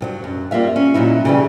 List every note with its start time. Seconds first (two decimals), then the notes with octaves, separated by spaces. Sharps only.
0.01 G2 F3 F#3
0.24 F#2
0.51 G3 A#3 F4 E5 F5
0.76 C#4
0.94 A#2 F#3 D#4 E4
1.25 C#3 E3 G3